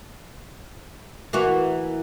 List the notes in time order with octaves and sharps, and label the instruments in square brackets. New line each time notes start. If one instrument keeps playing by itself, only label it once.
[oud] E3 A#3 F#4